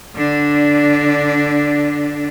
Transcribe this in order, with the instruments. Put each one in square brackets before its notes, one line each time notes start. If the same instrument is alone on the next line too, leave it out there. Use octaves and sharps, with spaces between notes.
[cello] D3 D4